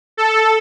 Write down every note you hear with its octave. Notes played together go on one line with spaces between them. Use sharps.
A4